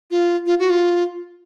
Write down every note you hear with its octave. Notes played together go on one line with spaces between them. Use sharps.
F4
F4
F#4
F4